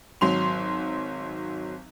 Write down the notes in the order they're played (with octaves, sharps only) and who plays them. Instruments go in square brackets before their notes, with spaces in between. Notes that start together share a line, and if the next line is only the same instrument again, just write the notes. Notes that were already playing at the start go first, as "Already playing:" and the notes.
[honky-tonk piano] G#1 F#3 C6 F7